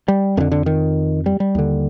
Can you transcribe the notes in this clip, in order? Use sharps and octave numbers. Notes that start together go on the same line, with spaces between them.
G3
F2 D3 D#3
D3
D#3
G3
G3
D#2 D3